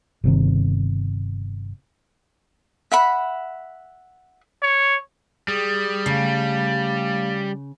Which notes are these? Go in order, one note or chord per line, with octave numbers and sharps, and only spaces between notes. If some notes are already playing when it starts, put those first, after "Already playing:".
G1 C3 D#3
E5 F#5 B5
C#5
G3 G#4 D#6
C#3 A3 F5